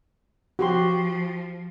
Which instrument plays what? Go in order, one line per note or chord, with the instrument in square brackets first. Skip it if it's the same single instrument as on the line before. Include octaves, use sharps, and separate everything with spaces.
[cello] F3 [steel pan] F#4 G4 C6